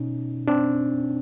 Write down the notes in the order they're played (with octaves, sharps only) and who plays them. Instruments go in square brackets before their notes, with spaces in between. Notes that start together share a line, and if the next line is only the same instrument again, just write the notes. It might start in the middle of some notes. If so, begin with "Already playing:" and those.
Already playing: [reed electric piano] B2 C#4 D#4
C4 D4